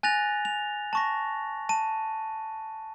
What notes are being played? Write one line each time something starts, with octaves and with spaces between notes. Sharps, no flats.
G#5 F#6 A6 A#6 F7
F7
A5 C#6 A#6
A5 D#7